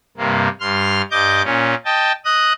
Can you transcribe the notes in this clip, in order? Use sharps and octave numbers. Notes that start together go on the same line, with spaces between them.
G2 C3 A#3
G2 C6 F6
G2 D#5 D6 G6
A#2 C#4
D#5 G5 A5
D#5 D#6 F#6